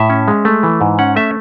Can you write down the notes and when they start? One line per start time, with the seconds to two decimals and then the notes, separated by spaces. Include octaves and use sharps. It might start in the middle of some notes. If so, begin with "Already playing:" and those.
Already playing: A2 E5
0.10 C#4
0.28 G#3
0.45 A3
0.63 E3
0.81 G#2
0.99 C#4 F#5
1.16 A3 E5